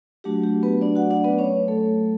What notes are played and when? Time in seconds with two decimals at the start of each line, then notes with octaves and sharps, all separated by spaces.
0.24 F#3 A3 D4 F#4 G4
0.44 G4
0.63 B3 B4
0.81 D4 D5
0.95 F#4 F#5
1.10 D4 D5
1.24 B3 B4
1.38 C#4 C#5
1.68 A3 A4